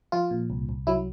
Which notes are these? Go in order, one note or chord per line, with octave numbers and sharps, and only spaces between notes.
F3 F4
A#2
C2
C2
F#3 E4